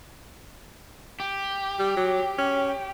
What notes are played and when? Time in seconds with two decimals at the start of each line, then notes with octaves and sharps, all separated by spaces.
1.20 G4
1.79 G3
1.96 F#3
2.38 C#4